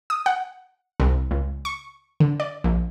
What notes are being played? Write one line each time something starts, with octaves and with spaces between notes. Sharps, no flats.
D#6
F#5
C2
C#2
C#6
D3
D5
A#1